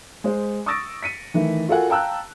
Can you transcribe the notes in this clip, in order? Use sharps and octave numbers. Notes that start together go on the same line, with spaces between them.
G#3 C5
C#6 D#6 E6 A6 A#6 D7
B6 C#7 D#7
D#3 E3 A3
F4 F#4 A4 A#4 F#5 G#5
F5 G5 A5 A#5 E6 F#6